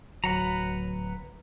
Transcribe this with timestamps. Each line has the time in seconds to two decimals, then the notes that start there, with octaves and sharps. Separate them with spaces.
0.24 D1 F#3 B4 F#5 A#5